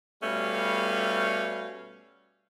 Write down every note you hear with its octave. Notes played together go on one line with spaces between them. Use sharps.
B2 G3 A3 C#4 F5